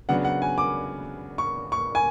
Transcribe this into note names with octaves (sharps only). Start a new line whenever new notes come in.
C#3 F#3 B3 D4 F#5
F#5
G#5
D6
C#6
C#6
G#5